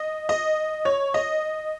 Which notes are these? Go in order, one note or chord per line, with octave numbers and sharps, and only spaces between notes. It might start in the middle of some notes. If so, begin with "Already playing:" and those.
Already playing: D#5
D#5
C#5
D#5